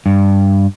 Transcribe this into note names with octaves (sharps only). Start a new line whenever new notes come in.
G2